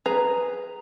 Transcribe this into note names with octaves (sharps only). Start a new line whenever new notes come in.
G#4 B4 A#5